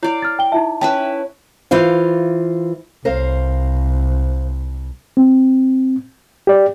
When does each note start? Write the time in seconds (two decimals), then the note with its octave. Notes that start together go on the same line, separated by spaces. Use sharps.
0.03 E4 C#5 D5 F5
0.22 F6 A6
0.39 G5 G7
0.52 D#4 E4 E5 A5
0.81 C#4 E4 B4 G5 A5
1.71 E3 F4 C5 F5
3.05 C2 A#4 C5 F5
5.17 C4
6.47 G4 D5